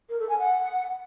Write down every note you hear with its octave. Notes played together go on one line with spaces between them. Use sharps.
A#4
A4
G#5
F#5